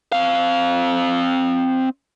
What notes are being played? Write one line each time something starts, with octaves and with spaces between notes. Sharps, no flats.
C4 F5